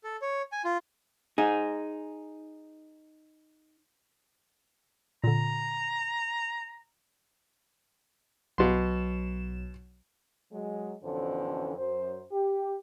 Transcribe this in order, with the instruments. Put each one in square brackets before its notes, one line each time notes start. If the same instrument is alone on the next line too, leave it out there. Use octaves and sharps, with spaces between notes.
[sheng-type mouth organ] A4
C#5
G#5
F4
[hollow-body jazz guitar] D#4 G#4
[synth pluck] A#2 D3 [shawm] A#5
[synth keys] B1 F#3 E7 [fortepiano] B2 C6
[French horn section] F#3 G#3
F2 B2 D3 E3 C#4 C5
F#2 C5
G4